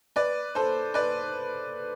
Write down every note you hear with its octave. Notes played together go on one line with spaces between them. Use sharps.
B4 D5
A4 C5
B4 D5